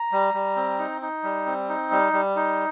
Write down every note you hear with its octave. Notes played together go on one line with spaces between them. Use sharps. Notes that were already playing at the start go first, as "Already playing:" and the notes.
Already playing: A#5
G3
G3
C4
D#4
D#4
G3
C4
D#4
G3
G3
D#4